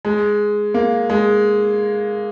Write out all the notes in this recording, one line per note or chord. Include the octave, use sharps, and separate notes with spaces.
G#3
A#3
G#3